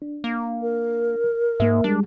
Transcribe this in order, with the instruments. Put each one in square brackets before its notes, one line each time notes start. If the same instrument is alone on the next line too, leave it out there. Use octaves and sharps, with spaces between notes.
[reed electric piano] D4
[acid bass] A#3
[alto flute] A#4
[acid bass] G#2 [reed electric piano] A#3 E5
[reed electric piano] G3 G#3 [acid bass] D4